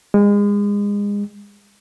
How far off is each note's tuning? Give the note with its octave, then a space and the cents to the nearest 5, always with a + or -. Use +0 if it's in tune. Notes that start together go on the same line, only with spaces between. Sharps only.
G#3 -30